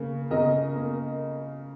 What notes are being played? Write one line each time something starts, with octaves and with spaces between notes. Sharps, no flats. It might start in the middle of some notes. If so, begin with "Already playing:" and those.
Already playing: C#3 A#3
C#3 A#4 D#5
A#3